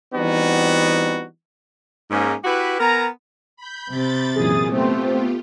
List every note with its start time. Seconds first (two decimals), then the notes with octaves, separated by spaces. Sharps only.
0.15 E3 G3 B3 C4 D#4 F#4
2.11 G#2 A#3 C#4
2.44 E4 F#4 G4 B4
2.80 B3 A#4 G#5 A#5
3.57 B5 G6
3.92 C3 A6
4.35 F#2 A#2 E3 G#4 D#6
4.72 A3 B3 C4 F4 G4